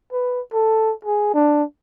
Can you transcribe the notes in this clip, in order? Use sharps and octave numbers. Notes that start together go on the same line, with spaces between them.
B4
A4
G#4
D4